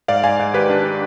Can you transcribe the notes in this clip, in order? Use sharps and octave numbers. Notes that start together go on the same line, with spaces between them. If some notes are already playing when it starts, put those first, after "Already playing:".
G#2 D5 F5
G#2 F5 G#5
G#2
D#3 G4 B4
D4
D4